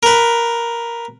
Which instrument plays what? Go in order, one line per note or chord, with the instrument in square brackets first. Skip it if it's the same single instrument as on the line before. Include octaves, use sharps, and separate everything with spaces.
[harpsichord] A#4 B4